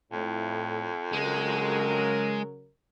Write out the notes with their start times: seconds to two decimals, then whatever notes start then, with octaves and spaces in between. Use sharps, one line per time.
0.12 F2 A2
1.13 C#3 F#3 G#3 A#4